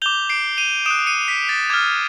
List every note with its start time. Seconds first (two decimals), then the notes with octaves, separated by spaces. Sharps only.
0.02 D6 G6 F7 G7
0.30 C7 D7
0.58 D#7 F7
0.86 D#6 F#6 D7 E7
1.07 C#7 D#7
1.28 B6
1.49 A6
1.70 D6 F6 G#6